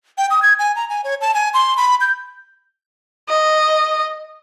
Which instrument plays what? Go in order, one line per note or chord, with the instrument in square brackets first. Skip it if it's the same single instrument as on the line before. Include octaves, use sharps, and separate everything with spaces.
[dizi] G5
D#6
G#6
G#5
A#5
G#5
C#5
A5
G#5
C6
B5
G6
[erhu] D#5